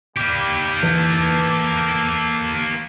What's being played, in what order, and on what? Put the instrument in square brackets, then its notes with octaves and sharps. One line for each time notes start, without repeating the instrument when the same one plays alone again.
[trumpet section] G3 [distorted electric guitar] A#3 G4
[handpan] E3 [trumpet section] A4 A5